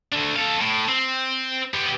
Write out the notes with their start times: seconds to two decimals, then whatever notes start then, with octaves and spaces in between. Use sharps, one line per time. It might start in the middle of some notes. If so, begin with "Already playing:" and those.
0.12 A3 D4
0.36 A4 F5
0.61 A2
0.88 C4
1.74 B3 G4